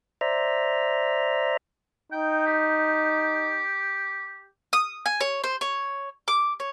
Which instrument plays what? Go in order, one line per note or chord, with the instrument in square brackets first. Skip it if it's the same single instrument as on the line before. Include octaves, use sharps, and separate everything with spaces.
[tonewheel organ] C5 D5 E5 A#5
[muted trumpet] D#4 [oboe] G5
[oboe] G4
[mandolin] D#6
G#5
C#5
C5
C#5
D6
C#5